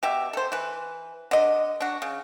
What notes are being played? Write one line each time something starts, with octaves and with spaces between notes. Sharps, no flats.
B2 G4 E5
A4 C5
E3 B4
D3 D#5
D4 F#4
C#3